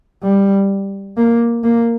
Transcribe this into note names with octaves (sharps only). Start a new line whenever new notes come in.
G3
A#3
A#3